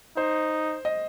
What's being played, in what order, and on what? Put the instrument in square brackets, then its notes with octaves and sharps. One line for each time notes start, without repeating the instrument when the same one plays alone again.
[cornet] D#4 [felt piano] C5
[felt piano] D#5